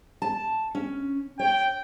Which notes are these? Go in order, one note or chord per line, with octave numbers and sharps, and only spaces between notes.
A5
C#4
C#5 G5